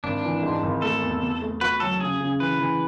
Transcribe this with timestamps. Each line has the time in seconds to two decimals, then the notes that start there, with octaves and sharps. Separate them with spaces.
0.04 G#1 D4
0.24 E3
0.43 G#2
0.63 G#1
0.82 A3 A4
1.02 E2
1.22 B2
1.42 A3
1.61 F#4 B4
1.80 F#3 A4
2.00 C#3 G#4
2.20 C#3
2.40 E3 B4
2.59 E3